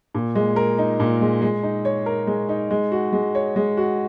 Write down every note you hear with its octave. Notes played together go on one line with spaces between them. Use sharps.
A#2
G#3
A#4
D#4
A#2
G#3
G#3
D#4
C#5
A#4
G#3
D#4
G#3
F#4
G#3
C#5
G#3
F#4